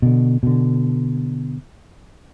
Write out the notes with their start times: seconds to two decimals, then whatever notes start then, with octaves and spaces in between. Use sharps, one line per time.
0.02 B2 D3
0.43 B2 D3